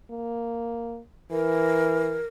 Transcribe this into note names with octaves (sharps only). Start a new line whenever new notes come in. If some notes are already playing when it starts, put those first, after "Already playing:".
A#3
E3 A#4